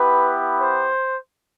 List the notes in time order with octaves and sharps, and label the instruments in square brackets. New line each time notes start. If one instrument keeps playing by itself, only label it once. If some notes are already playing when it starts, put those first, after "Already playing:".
Already playing: [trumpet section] B3 E4 G4 B4
C5